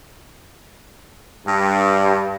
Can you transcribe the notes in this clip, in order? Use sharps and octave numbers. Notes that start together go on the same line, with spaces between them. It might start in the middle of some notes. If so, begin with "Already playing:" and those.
G2